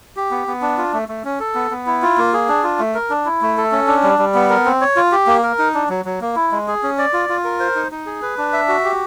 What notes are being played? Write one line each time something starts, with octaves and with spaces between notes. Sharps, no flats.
G4
B3
B3
D4
F4
A3
A3
C#4
A4
B3
B3
E4
F4
A#3
G#4
D4
F4
A3
A#4
D4
E4
A3
A4
C#4
D4
G3
G3
B3
A#4
C4
C#5
F4
G4
A#3
A#4
D#4
D4
F#3
F#3
A#3
E4
G#3
G#4
C#4
D5
F4
F4
A#4
C5
D#4
D#4
G#4
B4
D4
E5
F#4
G4